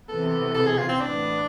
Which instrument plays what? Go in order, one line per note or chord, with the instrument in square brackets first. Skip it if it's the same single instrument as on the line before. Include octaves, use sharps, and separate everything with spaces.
[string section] C3 E3 B3 [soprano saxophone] A4
[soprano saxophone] A4
G#4
F4
C4
[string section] A2 E3 B3 [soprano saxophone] D4